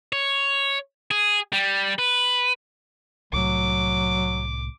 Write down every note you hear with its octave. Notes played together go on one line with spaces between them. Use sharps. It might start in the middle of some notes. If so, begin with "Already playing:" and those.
C#5
G#4
G3
B4
C2 A2 F#3 D6